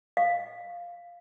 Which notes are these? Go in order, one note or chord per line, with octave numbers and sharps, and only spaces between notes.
F5